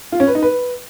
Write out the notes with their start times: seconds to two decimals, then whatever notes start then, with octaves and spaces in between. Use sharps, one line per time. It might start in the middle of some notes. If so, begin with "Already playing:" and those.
0.12 F4
0.20 C#4
0.27 B4
0.35 D#4
0.42 B4